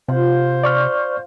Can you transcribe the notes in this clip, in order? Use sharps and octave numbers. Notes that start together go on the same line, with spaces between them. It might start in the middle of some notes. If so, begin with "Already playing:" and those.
C3 F4 C5 F#5
D5 C#6 F6